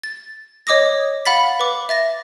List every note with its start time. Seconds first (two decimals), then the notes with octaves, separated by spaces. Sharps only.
0.03 A6
0.67 C#5 D#5 D6 D#6 A#6
1.25 F5 F#5 B5 A6 B6
1.59 B4 D6
1.89 E5 A6 A#6